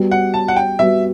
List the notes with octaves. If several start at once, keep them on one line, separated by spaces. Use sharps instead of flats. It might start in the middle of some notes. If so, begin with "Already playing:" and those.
Already playing: G3 B3 F#4
F#5
A5
F#5
G5
G3 B3 F#4 E5